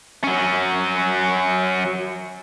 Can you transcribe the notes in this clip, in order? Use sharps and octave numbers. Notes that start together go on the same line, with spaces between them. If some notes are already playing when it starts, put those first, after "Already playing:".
F#3 C#4